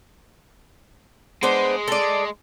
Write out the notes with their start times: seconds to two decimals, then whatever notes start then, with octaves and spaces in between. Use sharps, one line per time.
1.43 G#3 B3 D4 C5
1.88 A4 D5